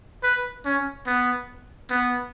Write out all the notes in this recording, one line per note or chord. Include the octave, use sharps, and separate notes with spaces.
B4
C#4
B3
B3